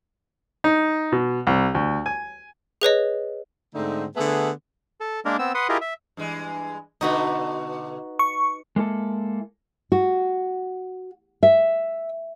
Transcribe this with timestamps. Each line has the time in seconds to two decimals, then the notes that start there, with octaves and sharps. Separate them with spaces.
0.64 D#4
1.12 B2
1.47 C2
1.75 D2
2.06 G#5
2.82 G#4 B4 C#5 D#5
3.74 G#2 D3 A3 C4 D#4
4.16 D3 A3 B3 G#4
5.01 A4
5.25 G#3 A#3 D4 A#4
5.39 B3 C4 E6
5.55 B4 F#5 C6 D#6
5.69 E4 F4 G4 G#4 A#4 D#5
5.81 E5
6.17 G2 E3 G#3
7.01 B2 D3 D#4 F#4 B4
8.19 C#6
8.76 G#3 A#3 E4 A4
9.92 F#4
11.43 E5